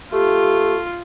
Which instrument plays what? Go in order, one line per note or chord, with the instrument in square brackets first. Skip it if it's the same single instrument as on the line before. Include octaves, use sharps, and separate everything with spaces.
[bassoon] A3 [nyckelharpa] F4 [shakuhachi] G4